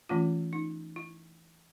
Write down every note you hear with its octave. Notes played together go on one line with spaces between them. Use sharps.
E3 A3 C#4 F4
D#4
E4